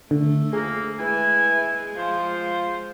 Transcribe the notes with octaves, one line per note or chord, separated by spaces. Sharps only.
D3 A3
F2 A#3 G#4
G#3 E4 B4 G#5
F3 F4 C5